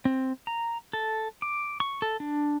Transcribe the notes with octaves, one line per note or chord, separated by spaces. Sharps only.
C4
A#5
A4
D6
C#6
A4
D4